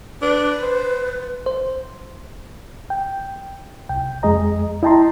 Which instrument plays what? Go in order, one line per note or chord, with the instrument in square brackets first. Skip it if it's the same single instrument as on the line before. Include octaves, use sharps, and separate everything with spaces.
[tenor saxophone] D4 [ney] B4
[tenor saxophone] C5
[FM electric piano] C5
[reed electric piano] G5
C2 G5
F2 G#3 G#4 D#5 A#5
E4 D#5 G5 A5 A#5 C6